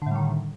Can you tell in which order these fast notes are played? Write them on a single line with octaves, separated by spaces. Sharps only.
D3 A2 G3 D#3